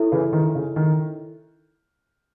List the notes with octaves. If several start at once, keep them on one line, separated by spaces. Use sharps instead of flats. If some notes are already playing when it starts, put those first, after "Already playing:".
Already playing: E4 A4 C#5 E5
C#3 E3
D#3
C#3
D#3